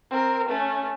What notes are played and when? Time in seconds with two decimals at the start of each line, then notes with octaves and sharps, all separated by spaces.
0.11 C4 A#4
0.49 A3 C#4